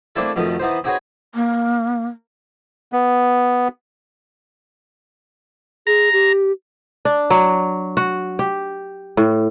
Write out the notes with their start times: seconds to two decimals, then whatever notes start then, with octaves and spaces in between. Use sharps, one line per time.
0.16 A3 A#3 C4 D4 E4 A4
0.36 F2 B2 D#3 A3
0.59 E3 B3 D#4 C5
0.84 C4 D#4 F#4 G#4 B4 C#5
1.35 A#3
2.93 B3
5.87 G#4 A#5
6.13 G4
7.05 D4
7.30 F#3
7.97 F#4
8.39 G4
9.17 A2